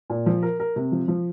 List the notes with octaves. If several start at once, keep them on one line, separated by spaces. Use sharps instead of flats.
A#2
F3
A#4
A#4
C3
F3
F3